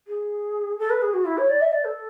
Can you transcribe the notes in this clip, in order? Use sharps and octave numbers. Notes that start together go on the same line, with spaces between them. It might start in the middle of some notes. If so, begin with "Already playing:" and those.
G#4
A4
B4
G#4
F#4
E4
C#5
D5
E5
D5
A4